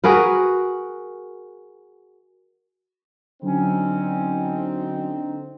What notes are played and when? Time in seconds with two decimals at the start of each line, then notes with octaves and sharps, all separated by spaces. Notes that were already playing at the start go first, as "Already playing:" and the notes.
0.04 F#4 G#4 A#4 B4
3.42 D3 F#3 C4 C#4 D#4